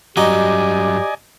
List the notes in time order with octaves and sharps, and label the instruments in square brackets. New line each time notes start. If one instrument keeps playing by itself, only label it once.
[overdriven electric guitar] G2 F#3 [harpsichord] D#4 F#4 [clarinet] G4 [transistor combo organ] D5 D#5 G#5